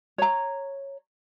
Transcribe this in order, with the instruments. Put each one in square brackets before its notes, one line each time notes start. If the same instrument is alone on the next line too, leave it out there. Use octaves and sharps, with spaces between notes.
[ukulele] C#5 A#5